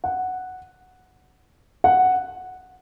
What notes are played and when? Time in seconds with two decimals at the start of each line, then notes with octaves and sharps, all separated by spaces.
0.04 F#5
1.84 F#5